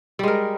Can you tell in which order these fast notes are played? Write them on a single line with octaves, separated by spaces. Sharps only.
G3 G#3 A#4